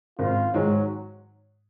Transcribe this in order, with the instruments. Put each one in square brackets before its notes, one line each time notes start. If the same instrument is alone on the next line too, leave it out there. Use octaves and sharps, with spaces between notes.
[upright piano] G#1 [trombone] F4
[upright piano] G#2 D#3 G#3 [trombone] F#3